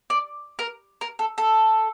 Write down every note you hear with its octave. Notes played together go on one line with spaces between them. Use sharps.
D5
A#4
A#4
A4
A4